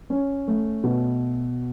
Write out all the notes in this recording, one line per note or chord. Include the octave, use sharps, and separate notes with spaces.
C#4
A3
B2